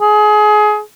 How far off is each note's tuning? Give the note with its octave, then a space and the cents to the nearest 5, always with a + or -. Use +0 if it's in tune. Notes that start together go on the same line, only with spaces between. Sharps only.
G#4 +25